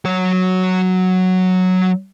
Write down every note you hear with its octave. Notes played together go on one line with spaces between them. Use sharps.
F#3 C#5